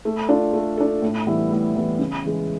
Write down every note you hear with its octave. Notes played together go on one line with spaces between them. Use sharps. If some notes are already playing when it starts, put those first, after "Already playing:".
A3
D4 F4 A4
A3
D4 F4 A4
A2
E3 G3 B3 E4
A2
E3 G3 B3 E4
C#3
E3 G#3